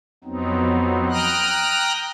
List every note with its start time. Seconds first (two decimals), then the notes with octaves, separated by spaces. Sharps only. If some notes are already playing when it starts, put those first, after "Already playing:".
0.24 F2 F#3 B3 C4 D#4
1.10 G5 A#5 D#6 F6 F#6